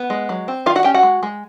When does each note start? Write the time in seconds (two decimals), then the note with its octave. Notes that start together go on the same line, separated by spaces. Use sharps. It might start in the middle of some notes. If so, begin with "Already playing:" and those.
Already playing: B3
0.10 G#3
0.29 F#3
0.48 C4
0.66 D#3 F4 F5
0.75 F#4 F#5
0.84 C#4 G4 G5
0.94 F#4 F#5
1.03 G#3
1.23 G#3